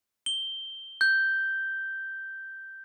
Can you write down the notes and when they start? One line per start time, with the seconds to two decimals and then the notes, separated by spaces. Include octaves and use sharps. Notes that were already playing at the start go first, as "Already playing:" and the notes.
0.26 G7
1.01 G6